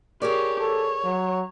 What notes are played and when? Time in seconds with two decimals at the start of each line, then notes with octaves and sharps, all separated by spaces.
0.22 G4 G#4 A#4 C#5 D5
0.59 A4 C#5
1.05 F#3